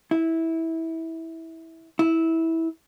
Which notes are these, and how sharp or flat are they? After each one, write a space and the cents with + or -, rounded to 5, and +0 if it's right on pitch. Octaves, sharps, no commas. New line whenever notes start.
E4 -15
E4 -15